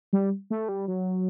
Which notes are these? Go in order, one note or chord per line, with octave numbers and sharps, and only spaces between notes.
G3
A3
G3
F#3